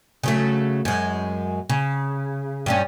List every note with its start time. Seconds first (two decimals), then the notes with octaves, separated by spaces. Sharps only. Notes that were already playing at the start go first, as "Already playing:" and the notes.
0.23 C#3 F#3 A3
0.85 F#2 G#3
1.70 C#3
2.66 G2 G3 C#4